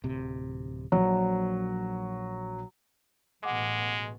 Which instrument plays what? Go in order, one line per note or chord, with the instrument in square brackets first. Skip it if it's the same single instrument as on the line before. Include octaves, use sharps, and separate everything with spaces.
[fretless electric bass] D1 C3
[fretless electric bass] A#1 [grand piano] F#3
[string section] A1 B2 [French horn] G#3 [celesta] F#5 D6